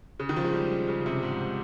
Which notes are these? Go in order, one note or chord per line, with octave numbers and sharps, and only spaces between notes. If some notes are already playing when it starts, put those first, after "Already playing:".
C#3
D#3
F3
G#3
G3
C#3
C3
G#2